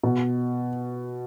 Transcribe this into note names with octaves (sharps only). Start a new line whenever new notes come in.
B2